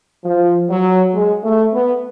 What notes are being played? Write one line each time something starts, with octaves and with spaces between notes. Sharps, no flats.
F3
F#3
G#3
A3
B3